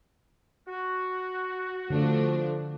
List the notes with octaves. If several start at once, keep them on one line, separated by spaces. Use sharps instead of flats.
F#4
D3 F3 A3 D4